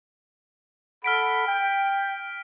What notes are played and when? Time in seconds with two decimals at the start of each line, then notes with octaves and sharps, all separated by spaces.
1.04 A4 F#5 B5 F6 B6 D7
1.48 G5